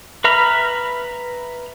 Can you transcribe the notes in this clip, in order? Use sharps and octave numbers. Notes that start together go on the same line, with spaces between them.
B4 E5 A#5 B5 F6